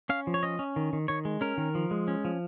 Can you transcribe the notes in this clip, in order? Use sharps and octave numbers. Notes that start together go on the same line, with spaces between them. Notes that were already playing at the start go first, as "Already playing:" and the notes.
C#4 F5
F3
C#5
C#4 D#5
C#4
D#3
D#3
D#3 C#5
G#3
C#4 A#4
D#3
F3
G#3
C#4
F3